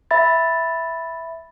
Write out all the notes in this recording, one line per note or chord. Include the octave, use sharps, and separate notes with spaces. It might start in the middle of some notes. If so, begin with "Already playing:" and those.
E5 B5 A6